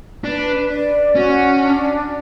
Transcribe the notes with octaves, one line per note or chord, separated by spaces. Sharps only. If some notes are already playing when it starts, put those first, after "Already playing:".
D4 B4
D5
C#4 F#4
D4